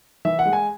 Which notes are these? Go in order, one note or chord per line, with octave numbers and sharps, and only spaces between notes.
E3 E5
F#5
G#3
G#5